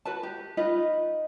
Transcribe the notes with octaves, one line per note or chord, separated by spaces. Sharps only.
F#4 B4 A5
G4
D#4 F4 B4 D#5